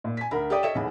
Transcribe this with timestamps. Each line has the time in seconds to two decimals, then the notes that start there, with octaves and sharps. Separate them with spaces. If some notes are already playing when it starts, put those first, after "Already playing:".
0.04 A#2
0.17 G#5 B6
0.31 D2 A#4 B5
0.50 G4 A4 C#5 D5 G5 D#6
0.63 A4 C#5 D#5 E5 E7
0.75 B1 E2 B5